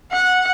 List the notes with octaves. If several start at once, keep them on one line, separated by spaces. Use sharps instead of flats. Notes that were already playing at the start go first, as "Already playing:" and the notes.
F#5